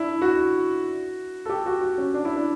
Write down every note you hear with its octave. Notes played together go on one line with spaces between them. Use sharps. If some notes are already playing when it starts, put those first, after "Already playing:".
Already playing: D4 E4
F#4
A4
G4
F#4
F#4
C#4
D4
E4
D4